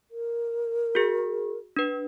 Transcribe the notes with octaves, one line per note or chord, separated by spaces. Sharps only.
A#4
F#4 G#4
D4 B4